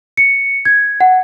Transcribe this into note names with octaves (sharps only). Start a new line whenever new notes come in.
C#7
G#6
F#5